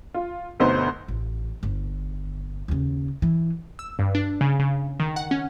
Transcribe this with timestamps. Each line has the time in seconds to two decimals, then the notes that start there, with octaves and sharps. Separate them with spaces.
0.14 F4
0.60 G1 D2 B2 D#4 B4 C5
1.08 A1
1.63 G1
2.68 D#2 C#3
3.22 E3
3.79 E6
3.99 G2
4.15 D4
4.41 C#3
4.59 C#3
5.00 D#3
5.16 F#5
5.31 C#4